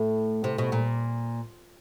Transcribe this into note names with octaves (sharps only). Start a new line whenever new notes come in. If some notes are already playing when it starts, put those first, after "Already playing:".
Already playing: A2
C3
B2
A#2